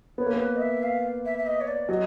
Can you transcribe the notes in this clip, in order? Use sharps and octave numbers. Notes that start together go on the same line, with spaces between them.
B3 C#5
A#3
B3
B4
D#5
E5
F5
E5
E5
D#5
C#5
D5
F#3 D#5